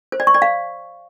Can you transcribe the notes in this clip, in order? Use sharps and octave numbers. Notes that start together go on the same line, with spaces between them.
C5
D5
C#6
D5
F5